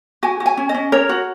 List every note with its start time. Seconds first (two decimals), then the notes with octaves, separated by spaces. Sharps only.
0.23 F#4 G#5
0.40 F#4
0.46 G#5
0.57 C#4
0.69 D#5
0.75 C#4
0.92 A#4 C#5
1.09 F#4